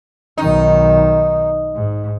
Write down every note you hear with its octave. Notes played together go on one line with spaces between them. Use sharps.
B1 D#3 D#4
G#2